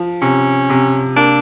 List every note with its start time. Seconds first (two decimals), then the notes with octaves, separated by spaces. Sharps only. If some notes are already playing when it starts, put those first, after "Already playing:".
Already playing: F3
0.22 C3 C#4
0.70 C3
1.16 A#3 D4